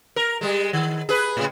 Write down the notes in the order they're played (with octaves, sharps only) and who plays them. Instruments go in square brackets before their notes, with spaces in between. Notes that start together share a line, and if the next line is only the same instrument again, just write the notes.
[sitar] A#4
G3 G#3
D#3
G#4 B4
A2 C#3